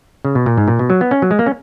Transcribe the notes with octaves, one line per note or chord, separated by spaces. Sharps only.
C#3
B2
A#2
G#2
A#2
B2
F#3
B3
C#4
F#3
G#3
A#3
C#4